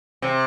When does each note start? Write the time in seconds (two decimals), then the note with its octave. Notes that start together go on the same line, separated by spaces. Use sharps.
0.22 C3